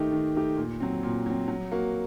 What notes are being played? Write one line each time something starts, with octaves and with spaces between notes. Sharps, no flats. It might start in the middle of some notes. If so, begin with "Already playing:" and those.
Already playing: D#3 A3 D#4 G4
D#3
A3 D#4 G4
A#2
F#3 C4
A#2
F#3 C4
F#3
A#3 F#4